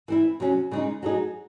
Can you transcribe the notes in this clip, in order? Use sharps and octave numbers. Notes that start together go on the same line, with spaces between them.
E3 C4 E4
C3 F#3 C#4
C#3 G#3 D#4
F#3 A3 D#4 G#4